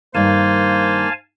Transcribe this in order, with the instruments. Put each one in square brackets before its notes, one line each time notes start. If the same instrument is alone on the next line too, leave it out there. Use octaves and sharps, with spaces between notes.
[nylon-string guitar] G2 D#3 [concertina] A#3 [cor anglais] C5 [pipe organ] F5 G#5 A5